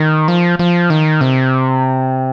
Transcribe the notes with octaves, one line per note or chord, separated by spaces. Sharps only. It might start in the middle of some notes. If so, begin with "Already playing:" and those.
Already playing: D#3
F3
F3
D#3
C3